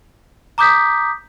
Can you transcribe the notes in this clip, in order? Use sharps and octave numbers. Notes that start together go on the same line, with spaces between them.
A#5 D6 D#6 G6 B6